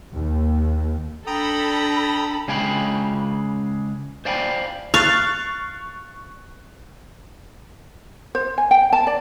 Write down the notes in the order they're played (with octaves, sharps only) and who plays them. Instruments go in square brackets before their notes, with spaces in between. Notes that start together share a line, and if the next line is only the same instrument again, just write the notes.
[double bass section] D#2
[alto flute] D4 [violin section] A4 B5 [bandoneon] G5 A#5 D#6
[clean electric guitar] C#3 G#3 G#4 F5 G5 B5
C5 D5 F5 G5 G#5 B5
[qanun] F5 [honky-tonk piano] C#6 F#6 A6
[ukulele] C5
G#5
G5
A5
D5